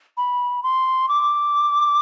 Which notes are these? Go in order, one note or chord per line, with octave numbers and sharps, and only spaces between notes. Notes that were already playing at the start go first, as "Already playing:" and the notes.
B5
C6
D6